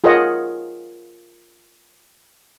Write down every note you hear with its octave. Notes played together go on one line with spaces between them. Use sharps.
F4 G#4 A#4 C#5 D#5 F#5